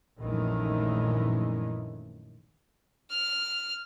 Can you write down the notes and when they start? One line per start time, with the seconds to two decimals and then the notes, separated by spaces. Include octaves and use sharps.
0.19 A#1 F#2 D#3 E3 G#3 A3
3.11 F6